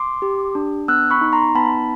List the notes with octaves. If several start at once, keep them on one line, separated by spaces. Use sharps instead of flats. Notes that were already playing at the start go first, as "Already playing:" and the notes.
Already playing: C6 D6
G4
D4
B3 E6 F#6
B5 C#6
D#4
A#5 C6
B3 A5 B5